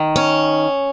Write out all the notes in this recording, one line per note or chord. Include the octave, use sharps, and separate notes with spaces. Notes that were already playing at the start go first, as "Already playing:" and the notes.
Already playing: D#3
C#4